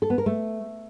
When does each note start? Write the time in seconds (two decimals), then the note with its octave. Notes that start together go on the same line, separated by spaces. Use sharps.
0.02 A4
0.10 B3
0.18 A#4
0.26 A3